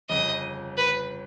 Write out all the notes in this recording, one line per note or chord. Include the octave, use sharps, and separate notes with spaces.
G1 F2 C#3 D#5
B4